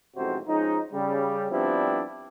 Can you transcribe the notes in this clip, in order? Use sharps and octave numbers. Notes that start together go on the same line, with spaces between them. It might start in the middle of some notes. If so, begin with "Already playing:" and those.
A1 F2 G#2 C3 F#4 C5
F3 G#3 C#4 D#4
C#3 G3
F3 G3 B3 C4 D4 E4